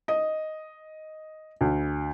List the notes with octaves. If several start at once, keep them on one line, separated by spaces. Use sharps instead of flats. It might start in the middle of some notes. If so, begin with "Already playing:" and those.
D#5
D2